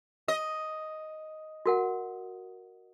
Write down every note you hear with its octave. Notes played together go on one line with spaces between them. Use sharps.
D#5
F#4 A#4 F#5